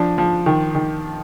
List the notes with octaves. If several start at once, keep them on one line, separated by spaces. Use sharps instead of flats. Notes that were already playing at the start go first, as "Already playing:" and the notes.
Already playing: F3 D4
F3
D#3
D#3